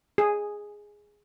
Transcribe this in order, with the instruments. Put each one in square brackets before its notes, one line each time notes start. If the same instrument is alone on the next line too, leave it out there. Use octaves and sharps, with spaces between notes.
[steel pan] G#4